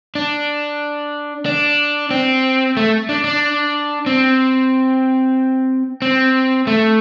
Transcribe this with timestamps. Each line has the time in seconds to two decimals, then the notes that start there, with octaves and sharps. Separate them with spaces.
0.15 D4
1.46 D4
2.11 C4
2.77 A3
3.09 D4
3.24 D4
4.06 C4
6.02 C4
6.67 A3